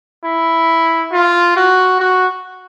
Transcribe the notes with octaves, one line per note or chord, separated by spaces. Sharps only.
E4
F4
F#4
F#4